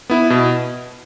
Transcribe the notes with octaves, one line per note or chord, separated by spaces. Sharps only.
B3 E4
B2